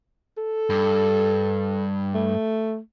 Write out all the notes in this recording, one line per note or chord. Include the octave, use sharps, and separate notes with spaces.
A4
G2
A3